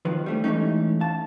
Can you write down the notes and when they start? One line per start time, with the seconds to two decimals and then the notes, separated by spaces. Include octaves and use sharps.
0.05 D#2 D#3 F3 B4
0.26 G3 A3 C#4
0.44 E3 G#3 A3 C#4 D#4
1.00 F5 A5